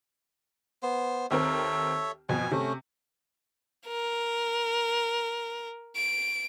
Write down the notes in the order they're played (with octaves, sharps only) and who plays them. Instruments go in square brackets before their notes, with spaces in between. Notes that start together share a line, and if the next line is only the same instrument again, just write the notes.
[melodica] B3 C5
[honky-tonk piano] D#2 C4 A#4 [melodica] A4 C#5 E5
[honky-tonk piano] F2 B2 [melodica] G#5
[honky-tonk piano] C3 [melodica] A3 C#4
[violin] A#4
D7